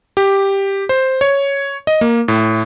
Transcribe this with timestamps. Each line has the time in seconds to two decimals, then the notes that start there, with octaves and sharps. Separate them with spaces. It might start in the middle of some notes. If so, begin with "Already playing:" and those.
0.17 G4
0.89 C5
1.21 C#5
1.87 D#5
2.01 A#3
2.28 A2